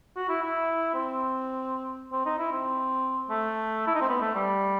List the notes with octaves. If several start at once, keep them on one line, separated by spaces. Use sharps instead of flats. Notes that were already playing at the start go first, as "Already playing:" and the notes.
F#4
E4
E4
C4
C4
D#4
E4
C4
A3
E4
D#4
C4
B3
A3
G3